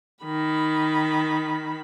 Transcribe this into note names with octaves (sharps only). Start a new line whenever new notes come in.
D#3 B5